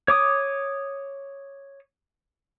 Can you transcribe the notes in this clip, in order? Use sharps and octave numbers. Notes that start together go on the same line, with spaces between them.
C#5 D6 D#6